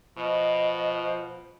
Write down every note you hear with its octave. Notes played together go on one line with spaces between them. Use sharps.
B2 F3 D#5